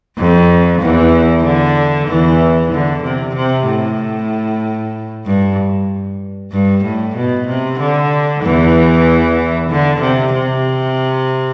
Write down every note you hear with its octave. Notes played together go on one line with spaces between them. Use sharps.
F2
E2 E3
D3
E2 E3
D3
C3
C3
A2
G2
G2
A2
B2
C3
D3
E2 E3
D3
C3
C3